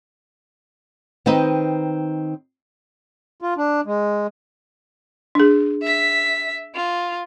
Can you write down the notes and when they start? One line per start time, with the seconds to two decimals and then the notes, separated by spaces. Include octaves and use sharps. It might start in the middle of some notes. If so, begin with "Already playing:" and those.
1.26 D#3 C4 D#4 B4 D#5
3.41 F4
3.57 D4
3.86 G#3
5.35 D4 G#4
5.83 E5 B6
6.75 F4